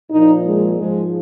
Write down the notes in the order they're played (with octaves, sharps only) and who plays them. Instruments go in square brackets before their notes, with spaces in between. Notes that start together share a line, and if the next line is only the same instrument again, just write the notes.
[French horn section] A#2 F3 D#4
G#3
G#2 F3 G#3